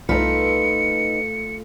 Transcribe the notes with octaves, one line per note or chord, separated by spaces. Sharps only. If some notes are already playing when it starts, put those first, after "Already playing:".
C2 A3 D#4 F4 B4 C#7